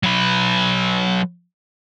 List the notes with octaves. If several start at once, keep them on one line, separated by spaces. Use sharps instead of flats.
F#3 B4